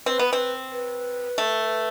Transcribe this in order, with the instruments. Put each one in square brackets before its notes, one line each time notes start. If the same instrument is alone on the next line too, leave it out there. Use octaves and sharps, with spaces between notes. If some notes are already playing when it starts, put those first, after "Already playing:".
[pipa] C4 [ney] B4
[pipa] B3
C4
[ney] B4
[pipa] A3